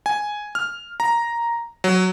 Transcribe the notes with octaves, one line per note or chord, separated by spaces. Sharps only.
G#5
F6
A#5
F#3